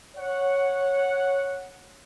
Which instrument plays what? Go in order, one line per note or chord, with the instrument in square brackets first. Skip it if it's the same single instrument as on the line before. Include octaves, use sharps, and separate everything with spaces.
[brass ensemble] C#5 F#5